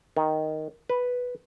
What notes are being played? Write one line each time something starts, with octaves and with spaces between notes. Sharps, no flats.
D#3
B4